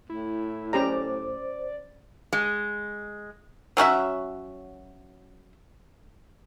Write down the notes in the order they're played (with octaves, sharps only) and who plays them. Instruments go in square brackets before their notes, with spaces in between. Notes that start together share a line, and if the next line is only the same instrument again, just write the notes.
[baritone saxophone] A2 [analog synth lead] E4
[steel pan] C#4 G4 A#5 [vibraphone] C5 [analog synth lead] D5
[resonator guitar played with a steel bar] G#3
[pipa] F#3 C#4 F#4 E5